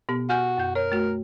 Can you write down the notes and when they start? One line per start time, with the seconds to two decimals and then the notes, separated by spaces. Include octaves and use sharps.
0.09 B2 B3 G4
0.30 F#4 G#5 F6 G6
0.58 F#2 G6
0.75 A#4 C#5
0.92 A3 F#4